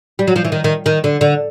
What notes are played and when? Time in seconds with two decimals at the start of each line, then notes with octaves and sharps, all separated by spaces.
0.19 G3
0.27 F#3
0.36 F3
0.44 E3
0.52 D#3
0.64 D#3
0.86 D#3
1.04 D3
1.21 D3